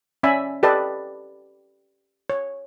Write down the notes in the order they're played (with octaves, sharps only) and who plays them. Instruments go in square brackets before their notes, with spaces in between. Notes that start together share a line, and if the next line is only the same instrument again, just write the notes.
[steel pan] C#4 D5 E5 G#5 B5
G4 A4 B4 D5 D#5 A5
C#5